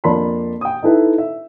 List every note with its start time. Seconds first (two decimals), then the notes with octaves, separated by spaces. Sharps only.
0.04 F2 A#3 D4 A5 B5 C6
0.61 G5 D#6
0.83 D#4 E4 A4 B4 E5
1.18 E5